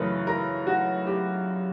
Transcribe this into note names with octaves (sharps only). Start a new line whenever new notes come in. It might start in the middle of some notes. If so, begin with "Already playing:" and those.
Already playing: F#2 C#3 E3 A3 A#4 B4
A#4
F#4
G4